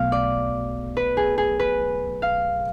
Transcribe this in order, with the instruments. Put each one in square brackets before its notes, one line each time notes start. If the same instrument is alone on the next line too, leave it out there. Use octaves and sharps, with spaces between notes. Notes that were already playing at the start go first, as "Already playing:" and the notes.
Already playing: [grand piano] B1 B2 A3 [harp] F5
[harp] D5
B4
G#4
G#4
B4
F5